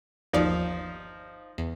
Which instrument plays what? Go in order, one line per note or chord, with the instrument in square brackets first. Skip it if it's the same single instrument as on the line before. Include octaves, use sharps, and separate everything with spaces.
[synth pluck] G1 D#2 D5 [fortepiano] F3 D#4
[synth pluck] E2